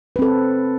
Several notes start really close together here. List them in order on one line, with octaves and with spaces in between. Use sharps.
B4 C4 A4